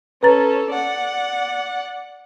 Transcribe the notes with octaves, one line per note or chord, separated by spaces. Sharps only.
C#4 A4 B4 A#5 A6
D5 F#5